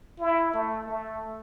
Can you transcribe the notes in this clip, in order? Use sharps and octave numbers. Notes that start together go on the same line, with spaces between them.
E4
A3
A3